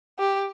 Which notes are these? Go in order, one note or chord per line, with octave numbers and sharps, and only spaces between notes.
G4